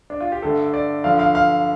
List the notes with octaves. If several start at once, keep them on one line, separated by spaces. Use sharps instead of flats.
D4
F4
G4
G2 D3 A3 A4
D5
G2 D3 F3 F5
F5
F5